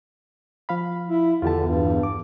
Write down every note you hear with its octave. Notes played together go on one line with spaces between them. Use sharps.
F3 F5 B5
E4
E2 D3 F4 G4 A5
G2
D6